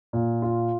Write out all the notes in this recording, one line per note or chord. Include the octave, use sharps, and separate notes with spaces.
A#2
F4